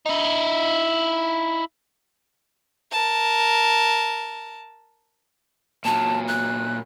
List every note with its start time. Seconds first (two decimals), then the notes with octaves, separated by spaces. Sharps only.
0.06 D#4 E4
2.92 A#4 A5
5.85 A#2 F#3 A5
6.28 F#6